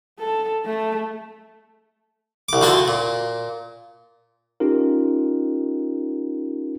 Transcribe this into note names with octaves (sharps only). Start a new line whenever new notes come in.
A4
A3
C2 D6
D2 D3 F4 F#4 A5
A#2
C#4 D#4 F4 G4 A#4